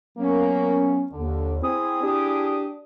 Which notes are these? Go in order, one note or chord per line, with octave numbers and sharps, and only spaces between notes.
F#3 A#3 B3 C#4
D#2 D3
C4 E4 G#4 D#6
D4 G4